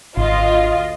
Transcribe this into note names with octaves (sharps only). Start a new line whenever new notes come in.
G#1 D2 F4 D#5